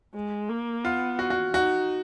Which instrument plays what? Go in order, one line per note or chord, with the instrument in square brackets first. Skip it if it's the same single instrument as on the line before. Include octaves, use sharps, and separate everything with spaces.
[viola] G#3
A#3
[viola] B3 [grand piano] F4
[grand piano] F#4
F#4
[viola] D#4 [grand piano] F#4